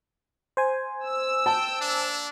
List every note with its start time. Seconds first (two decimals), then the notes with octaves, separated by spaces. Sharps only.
0.57 C5 G#5
1.06 E6
1.46 G5 A5
1.80 A#3 D4